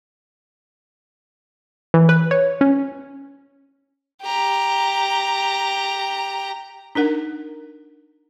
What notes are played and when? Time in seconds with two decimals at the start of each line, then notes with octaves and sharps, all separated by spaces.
1.94 E3
2.09 B4
2.31 C#5
2.61 C#4
4.22 G4 A#5
6.95 D4 D#4 A#4 F#5